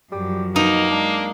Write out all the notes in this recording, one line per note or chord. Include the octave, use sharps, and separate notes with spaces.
F#2 F3 G3
B2 A#3 D#4
G#3 D4